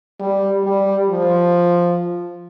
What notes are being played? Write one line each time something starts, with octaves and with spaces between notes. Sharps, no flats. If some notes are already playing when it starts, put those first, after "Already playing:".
G3
G3
F3